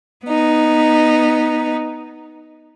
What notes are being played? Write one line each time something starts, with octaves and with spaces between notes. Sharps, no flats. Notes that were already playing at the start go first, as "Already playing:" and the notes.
B3 D#4